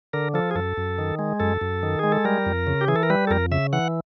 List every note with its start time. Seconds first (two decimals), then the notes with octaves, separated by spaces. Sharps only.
0.13 D3 A#4
0.34 F3 A4
0.51 G#4
0.55 F#2 A4
0.77 F#2
0.98 D#3
1.19 G#3
1.40 F#2 A4
1.61 F#2
1.83 D#3
1.99 G#3 G#4
2.12 A4
2.25 G3 A#4
2.46 F2
2.67 C#3
2.81 G4
2.88 E3 G#4
2.96 A4
3.03 A#4
3.10 G3 B4
3.27 A4
3.30 F2 A#4
3.51 C#3 E5
3.73 E3 F#5